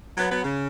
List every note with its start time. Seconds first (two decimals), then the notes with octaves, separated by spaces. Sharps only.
0.18 F#3 B3
0.30 F#3 B3
0.44 C#3